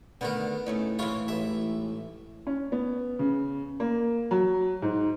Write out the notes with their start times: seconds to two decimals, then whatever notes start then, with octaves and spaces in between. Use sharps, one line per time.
0.21 D3 D#3 A3 B3 A#4
0.66 A2 A3 C#4 D#4
0.99 G#2 E3 E4 F4 C#5
1.28 A1 E5
2.47 C#4
2.72 B3
3.19 C#3
3.80 A#3
4.31 F#3
4.82 G#2